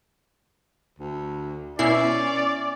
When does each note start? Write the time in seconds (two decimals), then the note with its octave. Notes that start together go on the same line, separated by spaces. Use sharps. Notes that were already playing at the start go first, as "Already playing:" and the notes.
0.99 D2
1.79 B2 C#4 E4 D5 C7